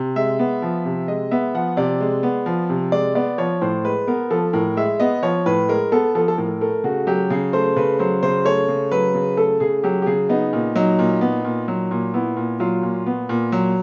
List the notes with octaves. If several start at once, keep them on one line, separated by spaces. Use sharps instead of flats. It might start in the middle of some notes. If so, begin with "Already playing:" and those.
Already playing: C3
G#3 E5
B3
F3
C3
G#3 D#5
B3 E5
F3 F#5
C3 D5
G#3
B3
F3
C3
G#3 D5
B3 D5
F3 C#5
A2 C5
G#3 B4
B3 A#4
F3 A4
A2 A#4
G#3 E5
B3 D#5
F3 C#5
A2 B4
G#3 A#4
B3 A4
F3 A4
A4
A2 A#4
A3 A#4
C#3 F#4
F#3 G4
C#3 G#4
A3 C5
C#3 B4
F#3 C5
C#3 C5
A3 C#5
C#3
F#3 B4
C#3
A3 A4
C#3 G#4
F#3 G4
G4
C#3 G#4
B3 D#4
A#2
F#3 D#4
A#2
B3
A#2
F#3
A#2
B3 E4
A#2
F#3 F4
A#2
B3
A#2
F#3